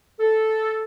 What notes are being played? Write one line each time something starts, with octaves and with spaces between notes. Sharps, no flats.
A4